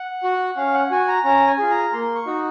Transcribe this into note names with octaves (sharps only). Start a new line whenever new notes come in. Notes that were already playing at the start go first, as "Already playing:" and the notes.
Already playing: F#5
F#4
C#4 F5
F#5
F#4 G#5
A#5
C#4 A#5
G#5
F4 G#4
A#5
A#3 C6
C#6
D#4 F#4